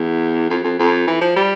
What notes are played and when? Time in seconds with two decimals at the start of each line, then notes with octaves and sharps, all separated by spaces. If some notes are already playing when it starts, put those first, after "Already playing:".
Already playing: E2
0.50 F2
0.64 F2
0.79 F2
1.07 E3
1.21 F3
1.36 G3